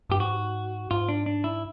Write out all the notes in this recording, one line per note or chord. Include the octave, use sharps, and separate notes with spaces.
G2 G4
G#2 F#4
G#2 F4
D4
D4
E4